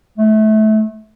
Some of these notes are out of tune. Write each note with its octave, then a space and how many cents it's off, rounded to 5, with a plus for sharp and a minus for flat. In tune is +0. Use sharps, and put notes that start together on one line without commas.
A3 -25